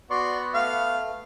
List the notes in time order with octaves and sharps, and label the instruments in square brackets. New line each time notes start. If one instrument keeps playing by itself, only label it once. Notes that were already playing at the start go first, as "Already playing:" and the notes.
[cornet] B3 [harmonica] F#4 [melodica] D5 C6 C#6
[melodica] A3 [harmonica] F5